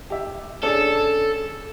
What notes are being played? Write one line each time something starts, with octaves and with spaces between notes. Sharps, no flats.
G4 E5
C#4 D4 G#4 A4